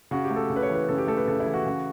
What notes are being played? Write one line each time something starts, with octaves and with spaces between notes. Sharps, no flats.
C#3 F#4
G4
A3
A4
C#3
B4
C#5
E3
B4
C#3 A4
G4
A3 A4
B4
C#3 A4
E4
E3
F#4
C#3